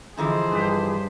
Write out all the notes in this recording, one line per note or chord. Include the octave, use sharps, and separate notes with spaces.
D3 E3 F3 D#4 G#4 C5
G2 D4 G4